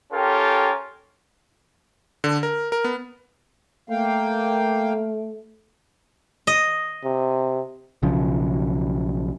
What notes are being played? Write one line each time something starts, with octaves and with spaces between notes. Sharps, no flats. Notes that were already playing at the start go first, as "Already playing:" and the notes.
C#4 F4 G4 A4 A#4 G5
D3
A#4
A#4
B3
A3 A#3 F5 G5
D#5
C3
B1 C#3 F3